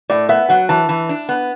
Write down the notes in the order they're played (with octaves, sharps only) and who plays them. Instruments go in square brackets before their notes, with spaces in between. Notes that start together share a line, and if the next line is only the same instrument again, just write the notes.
[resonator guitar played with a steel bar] A2 [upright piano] D5
[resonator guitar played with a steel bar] B3 [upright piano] E5
[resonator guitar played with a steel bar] F#3 [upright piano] F#5
[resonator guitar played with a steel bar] E3 [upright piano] A5
[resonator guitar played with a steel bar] E3
D4
B3